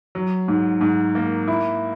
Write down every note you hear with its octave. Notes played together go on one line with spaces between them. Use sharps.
F#3
G#2
G#2
A#3
E4